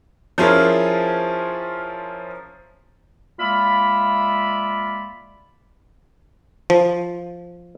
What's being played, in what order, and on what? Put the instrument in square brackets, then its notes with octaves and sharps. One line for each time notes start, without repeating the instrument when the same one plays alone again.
[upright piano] F3 C#4 E4 F4 G#4 A#4
[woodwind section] G#3 A#3 F4 D5 E5 B5
[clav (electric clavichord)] F3